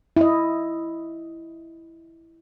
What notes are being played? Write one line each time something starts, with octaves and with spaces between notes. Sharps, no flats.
E4 D#5